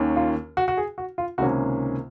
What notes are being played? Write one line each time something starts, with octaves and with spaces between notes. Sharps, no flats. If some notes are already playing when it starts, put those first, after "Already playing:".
Already playing: D#2 D#3 A#3 C#4
F4
F#4
F#4
G#4
F#4
F4
C#2 C3 D#3 A#3 C#4 F#4